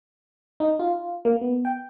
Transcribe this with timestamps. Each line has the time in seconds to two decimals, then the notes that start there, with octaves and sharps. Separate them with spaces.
0.60 D#4
0.80 F4
1.25 A#3
1.41 B3
1.65 G5